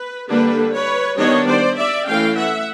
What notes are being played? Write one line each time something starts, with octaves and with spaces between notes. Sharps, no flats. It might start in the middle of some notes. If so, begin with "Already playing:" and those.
Already playing: B4
D3 G3 A#3 D4 A4 B4
B4 C#5
D#3 G3 B3 D4 C#5 D#5
C5 D5
D5 E5
E3 A3 C#4 F5 G5
E5 F#5